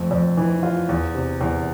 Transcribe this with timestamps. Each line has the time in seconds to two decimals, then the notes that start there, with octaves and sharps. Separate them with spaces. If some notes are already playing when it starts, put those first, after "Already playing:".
Already playing: F2 A3
0.11 F2
0.37 E3
0.63 F4
0.89 E2
1.15 C3
1.41 E2